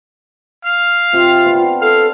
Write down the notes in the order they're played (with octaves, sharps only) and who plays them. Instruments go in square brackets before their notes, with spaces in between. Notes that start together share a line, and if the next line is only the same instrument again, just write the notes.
[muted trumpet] F5
[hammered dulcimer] C3 [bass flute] F4
[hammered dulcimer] B3 C4 D4
[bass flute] A4 [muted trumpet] F5